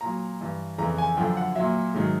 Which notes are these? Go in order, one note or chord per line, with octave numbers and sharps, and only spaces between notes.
A#2 F#3 A#5
G2 E3
F2 C#3 E3 A#5
G#5
F#2 D3 F3 G5
F#5
A#2 F#3 E5
G#2 D#3 F#3